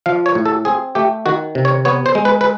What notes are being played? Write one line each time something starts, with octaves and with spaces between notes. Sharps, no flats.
F3 F5
C#5
A2
A4
C4 G#4
A3 G4
D#3 F#4
C3
C#5
B3 C#5
C5
G#3
B4
B4